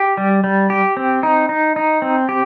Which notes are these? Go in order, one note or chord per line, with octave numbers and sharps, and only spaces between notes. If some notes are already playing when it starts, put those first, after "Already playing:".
Already playing: G4
G3
G3
G4
C4
D#4
D#4
D#4
C4
G4